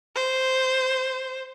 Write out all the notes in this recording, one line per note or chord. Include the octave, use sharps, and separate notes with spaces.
C5